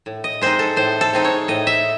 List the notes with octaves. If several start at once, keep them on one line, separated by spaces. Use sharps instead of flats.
A2
D#5
G#3 C4 D#4 C5
A4
A2 C5
A4
G#3 C4 D#4
C#5
A2 D#5
E5